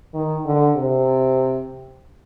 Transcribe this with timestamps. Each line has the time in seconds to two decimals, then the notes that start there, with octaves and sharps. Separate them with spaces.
0.14 D#3
0.45 D3
0.76 C3